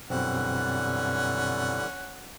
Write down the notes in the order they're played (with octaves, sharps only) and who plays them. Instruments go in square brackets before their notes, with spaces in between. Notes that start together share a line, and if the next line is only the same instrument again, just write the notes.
[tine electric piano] F#2 B2 C4 [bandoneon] D3 E3 G3 [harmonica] C#4 F#5